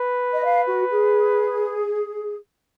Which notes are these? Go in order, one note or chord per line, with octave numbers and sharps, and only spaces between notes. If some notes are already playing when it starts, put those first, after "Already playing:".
Already playing: B4
D#5
F5
F#4
G#4